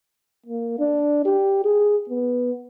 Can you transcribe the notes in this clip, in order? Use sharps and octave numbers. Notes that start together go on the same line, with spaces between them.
A#3
D4
G4
G#4
B3